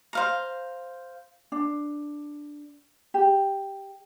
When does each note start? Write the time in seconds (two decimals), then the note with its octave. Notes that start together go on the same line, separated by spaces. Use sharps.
0.13 C5 F5 A#5
1.52 D4
3.14 G4